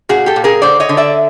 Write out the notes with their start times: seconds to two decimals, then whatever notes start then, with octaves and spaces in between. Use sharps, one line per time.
0.09 A#2 F#4 G#4
0.26 G4 A4
0.36 A#2
0.44 G#4 A#4
0.62 D3 C5 D5
0.80 C#5 D#5
0.89 D3
0.97 D5 E5